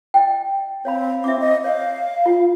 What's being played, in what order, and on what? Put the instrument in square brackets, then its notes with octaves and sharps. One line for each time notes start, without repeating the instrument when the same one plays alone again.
[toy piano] D#5 G5
[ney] C4 [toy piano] C#5 F5 B5
[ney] C4 [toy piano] E5 D6
[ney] D#5
[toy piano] C#5 [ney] F5
[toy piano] F4